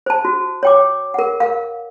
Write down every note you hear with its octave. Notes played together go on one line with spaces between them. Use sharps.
C5 A5
F#4
C#5 G5 D6
A#4 F#5
A#4 F5